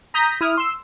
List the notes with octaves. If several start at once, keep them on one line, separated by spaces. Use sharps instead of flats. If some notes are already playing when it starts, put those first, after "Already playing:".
A#5 D#6 G6 A#6 B6
E4 D#6 F6
C6 E6